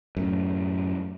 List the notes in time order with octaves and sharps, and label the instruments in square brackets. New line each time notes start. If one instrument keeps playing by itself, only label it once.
[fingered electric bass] F#2 A2